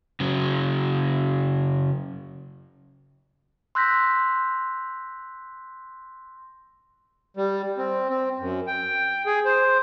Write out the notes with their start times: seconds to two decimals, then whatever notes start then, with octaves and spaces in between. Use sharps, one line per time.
0.20 C#3 F#3
3.75 C6 E6 F#6 G6 A#6 B6
7.37 G3
7.78 C4
8.09 C4
8.39 F#2
8.67 G5
9.26 G#4
9.45 C5